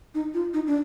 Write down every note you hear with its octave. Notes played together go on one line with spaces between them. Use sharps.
D#4
F4
D#4
D4